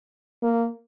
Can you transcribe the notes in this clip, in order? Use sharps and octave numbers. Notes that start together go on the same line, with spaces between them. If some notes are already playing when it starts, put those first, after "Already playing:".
A#3